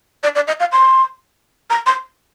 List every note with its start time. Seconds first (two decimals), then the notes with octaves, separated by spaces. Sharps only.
0.23 D5
0.35 D5
0.48 D#5
0.60 F5
0.72 C6
1.70 A#5
1.86 C6